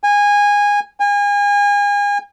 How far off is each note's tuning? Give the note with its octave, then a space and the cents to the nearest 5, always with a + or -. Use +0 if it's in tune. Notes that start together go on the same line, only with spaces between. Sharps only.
G#5 -20
G#5 -35